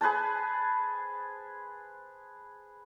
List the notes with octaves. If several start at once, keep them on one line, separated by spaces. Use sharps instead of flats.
G#4 B4 C5 A5